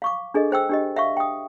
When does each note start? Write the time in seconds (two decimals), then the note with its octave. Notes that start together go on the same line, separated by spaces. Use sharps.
0.02 F5 C#6 D6
0.34 D4 G#4 A4 D#5
0.51 G#4 C5 G5 E6
0.69 D4 G4 D#5
0.96 E5 F5 C#6
1.17 G5 D#6